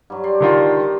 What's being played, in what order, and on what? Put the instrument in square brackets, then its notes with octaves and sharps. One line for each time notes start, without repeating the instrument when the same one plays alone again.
[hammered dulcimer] G2 F#3
G4 D5 C6
[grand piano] D3 D#3 F4 [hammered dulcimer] D#4 A5